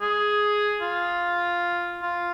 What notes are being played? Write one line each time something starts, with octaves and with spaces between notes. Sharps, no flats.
G#4
F4
F4